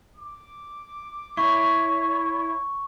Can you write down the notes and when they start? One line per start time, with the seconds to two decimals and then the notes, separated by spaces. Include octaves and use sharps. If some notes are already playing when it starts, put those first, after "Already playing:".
0.17 D6
1.37 E4 C#5 C#6